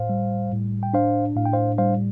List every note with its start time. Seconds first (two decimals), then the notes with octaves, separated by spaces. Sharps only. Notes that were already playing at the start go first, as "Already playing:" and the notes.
Already playing: A2 C5 F5
0.09 G3
0.52 A2
0.83 G5
0.94 D4 C5 F5
1.36 A2 F5
1.46 G5
1.53 C5 F5
1.78 G3 C5 F5